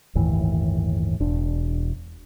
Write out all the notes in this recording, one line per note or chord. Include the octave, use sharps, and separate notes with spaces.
G1 D#2 A2 E3
E1 D4